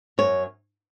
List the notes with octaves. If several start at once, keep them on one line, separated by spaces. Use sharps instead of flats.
F#2 C#5